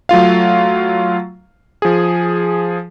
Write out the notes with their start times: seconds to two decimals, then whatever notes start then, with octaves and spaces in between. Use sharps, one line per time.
0.09 F#3 A3 F4 F5
1.82 F3 G#4